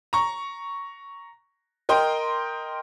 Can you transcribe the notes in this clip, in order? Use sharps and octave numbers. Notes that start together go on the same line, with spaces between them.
A#5 C#6
A#4 D#5 G5 C6